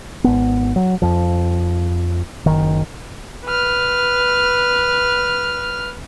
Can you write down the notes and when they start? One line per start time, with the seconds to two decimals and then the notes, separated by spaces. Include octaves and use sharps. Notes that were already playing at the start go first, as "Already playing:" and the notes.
0.24 G#1 B3
0.76 F#3
1.02 F2 F3
2.46 F#1 D#3
3.45 B4 F6